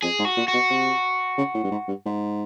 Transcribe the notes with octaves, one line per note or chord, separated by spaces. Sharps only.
F2 G#4
G#2
F#4
A#2
F#4
B2
C3
C#3
A2
G2
G#2
G2
G#2